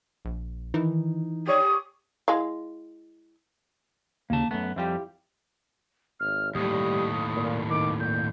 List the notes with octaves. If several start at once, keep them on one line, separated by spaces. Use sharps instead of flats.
A#1
D#3 E3 D#4
G4 C#5 D5 D#6
G#3 E4 F5
D#2 C#3 A#3 A5
F#2 A3 B3
F2 G3 E4 F4 G4
G#1 F6
D#2 A2 G3 D#6
A#2
D#3 D6
A#2 G6